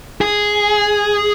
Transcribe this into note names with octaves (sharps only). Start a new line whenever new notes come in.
G#4